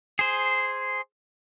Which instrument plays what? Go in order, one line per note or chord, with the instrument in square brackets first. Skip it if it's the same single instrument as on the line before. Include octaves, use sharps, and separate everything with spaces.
[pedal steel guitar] G#4 C5